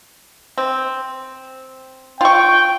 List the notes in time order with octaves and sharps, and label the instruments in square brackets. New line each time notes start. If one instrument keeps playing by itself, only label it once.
[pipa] C4
[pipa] F4 C#6 [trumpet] G5